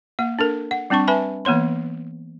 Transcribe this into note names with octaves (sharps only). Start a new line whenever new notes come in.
A#3 F#5
D4 A4 A#4
F#5
G3 C4 D4 A5 C#6
B4 E5 G#5 A5 B5
E3 A#3 B3 C#5 C6